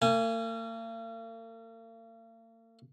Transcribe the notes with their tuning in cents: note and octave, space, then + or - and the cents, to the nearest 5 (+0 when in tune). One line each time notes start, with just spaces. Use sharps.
A#3 -45 G#5 +0